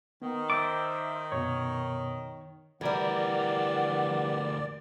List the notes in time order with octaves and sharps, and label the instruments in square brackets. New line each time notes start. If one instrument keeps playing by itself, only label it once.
[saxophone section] D#3 [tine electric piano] B3
[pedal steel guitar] C5 E5 D6 [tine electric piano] A6
[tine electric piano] F#2 B2 B3 [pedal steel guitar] C#5
[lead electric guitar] D2 A#4 [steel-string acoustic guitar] E3 G3 [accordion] D5 [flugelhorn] F#5